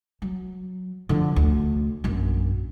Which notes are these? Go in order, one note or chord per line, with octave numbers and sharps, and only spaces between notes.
F#3
D3 F3
D2
A#1 F#2